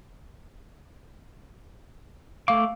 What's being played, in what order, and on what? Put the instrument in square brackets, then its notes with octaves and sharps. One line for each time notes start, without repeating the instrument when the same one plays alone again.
[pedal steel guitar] A3 D6 [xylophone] F5